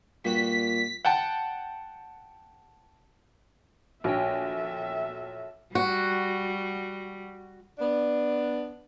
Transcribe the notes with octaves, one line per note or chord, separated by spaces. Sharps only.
G2 A#2 F#4 B6
F#5 G5 A5
A#1 F#4 A4 C#5 E5 G5
G3 F#4
B3 D4